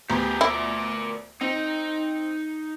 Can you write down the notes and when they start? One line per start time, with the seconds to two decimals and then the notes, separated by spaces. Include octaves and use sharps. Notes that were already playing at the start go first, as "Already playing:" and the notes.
0.10 D2 B3 G4 G#4 A#5
0.41 E4 A#4 D5
1.41 C4 D#4